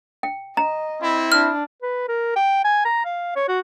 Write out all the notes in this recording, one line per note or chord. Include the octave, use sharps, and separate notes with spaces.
G5
D#5 A#5
C4 E4
D4 F6
B4
A#4
G5
G#5
A#5
F5
C#5
F#4